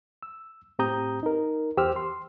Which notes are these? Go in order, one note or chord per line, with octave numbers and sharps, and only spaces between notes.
E6
A2 C4 G4 A#5 D#6 G6
D#4 A#4
E2 G4 C5 E6 F6
C6